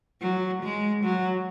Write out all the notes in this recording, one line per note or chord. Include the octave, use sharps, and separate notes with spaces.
F#3
G#3
F#3